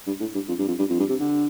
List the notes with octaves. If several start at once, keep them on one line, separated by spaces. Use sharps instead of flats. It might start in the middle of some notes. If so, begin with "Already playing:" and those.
G2
A2
G2
F2
G2
F2
G2
F2
G2
C3
D3